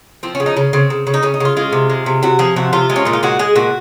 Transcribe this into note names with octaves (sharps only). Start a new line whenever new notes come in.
F3 C4
C#4
C#3
D#4
C#3 C#4
C#3 C4
C#3
C#3
D#4
C#3 C#4
D#4
C#3 F4
G#3 F4
C3
G#3
C3
C3 F#4
F3 G#4
C3 F#4
C3 F4
G#3
C#4
A#2 D#4
F4
G#3 F#4
G#3 G#4
A#2 F#4